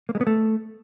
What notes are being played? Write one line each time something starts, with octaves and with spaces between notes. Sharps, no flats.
A#3
G#3
B3
A3